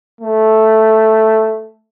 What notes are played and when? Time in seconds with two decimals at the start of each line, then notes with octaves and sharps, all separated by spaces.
0.21 A3